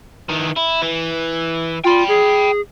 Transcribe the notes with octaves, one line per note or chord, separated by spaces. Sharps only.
D#3 E3
E4
E3
F4 G5 B5
G#4